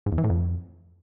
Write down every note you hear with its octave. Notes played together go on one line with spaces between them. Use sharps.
G#2
E2
E3
A2
F2